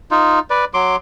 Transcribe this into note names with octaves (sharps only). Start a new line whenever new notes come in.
D#4 F4
B4 D5
F#3 C6 D6